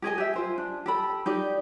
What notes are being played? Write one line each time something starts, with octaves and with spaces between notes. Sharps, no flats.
G4 G#4 D#5 G#5
G4 E5
F4 C5 G#5
D4
G4 A4 B5
D#4 G4 D5